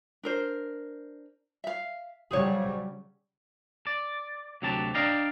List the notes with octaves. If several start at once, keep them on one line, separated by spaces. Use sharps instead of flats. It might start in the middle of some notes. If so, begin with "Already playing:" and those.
D4 A#4 C5
E5 F5
C#3 F#3 G3 G#4 C5 C#5
D5
D2 C3 F#3 G4 A5
D4 D5 D#5 F5 G5 A#5